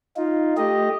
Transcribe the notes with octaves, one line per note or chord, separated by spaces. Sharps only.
D#4 F4
A3 G4 D#5